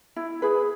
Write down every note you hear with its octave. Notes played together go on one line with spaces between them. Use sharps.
E4
G#4 B4